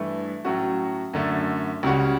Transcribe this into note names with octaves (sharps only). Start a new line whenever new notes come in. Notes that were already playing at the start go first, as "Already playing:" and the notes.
Already playing: G2 E3 A3
A2 F#3 A3 C#4 F#4
F#2 D3 A3
C#2 C#3 G3 C#4 F#4